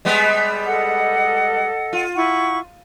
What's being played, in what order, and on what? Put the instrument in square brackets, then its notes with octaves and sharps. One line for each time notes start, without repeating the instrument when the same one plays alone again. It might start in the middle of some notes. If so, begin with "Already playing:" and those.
[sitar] G3 G#3 B3
[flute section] A4 D#5 F#5
[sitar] F4
[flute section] E4 F#5 C#6